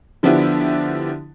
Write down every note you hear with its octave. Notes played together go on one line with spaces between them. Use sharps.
D3 F3 B3 D4 E4 G4